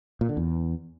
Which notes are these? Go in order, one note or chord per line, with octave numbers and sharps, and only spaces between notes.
A#2
D3
E2